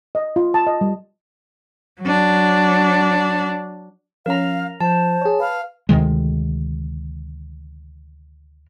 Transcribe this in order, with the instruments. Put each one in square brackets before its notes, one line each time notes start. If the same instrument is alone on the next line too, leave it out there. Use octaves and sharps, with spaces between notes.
[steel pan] D#5
F4
A5
D#5
G3
[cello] F#3 D4
[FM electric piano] F3 C#4 [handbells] A#4 A#5 [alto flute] F5
[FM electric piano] F3 [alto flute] C5 [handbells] A5
[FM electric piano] G#4 C#5
[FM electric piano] B4 [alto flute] F5
[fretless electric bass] D2 C3 D#3 G#3